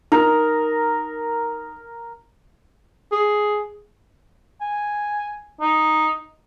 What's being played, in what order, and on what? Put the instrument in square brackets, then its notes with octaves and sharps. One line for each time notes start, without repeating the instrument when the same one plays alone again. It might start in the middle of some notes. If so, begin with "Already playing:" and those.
[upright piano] D#4 [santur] A#4
[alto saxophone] G#4
[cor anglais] G#5
D#4